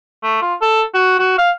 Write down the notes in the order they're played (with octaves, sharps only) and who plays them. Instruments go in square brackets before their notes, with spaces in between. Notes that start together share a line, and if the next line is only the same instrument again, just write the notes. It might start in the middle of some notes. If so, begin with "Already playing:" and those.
[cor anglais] A3
F4
A4
F#4
F#4
F5